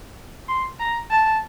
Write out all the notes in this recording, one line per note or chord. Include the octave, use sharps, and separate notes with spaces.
C6
A#5
A5